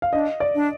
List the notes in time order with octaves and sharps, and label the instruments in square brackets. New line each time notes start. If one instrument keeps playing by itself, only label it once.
[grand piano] F5
[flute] D4 [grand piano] D#5
[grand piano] D5
[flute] D4